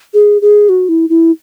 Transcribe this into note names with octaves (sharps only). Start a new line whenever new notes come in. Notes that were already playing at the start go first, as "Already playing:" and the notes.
G#4
G#4
F#4
E4
E4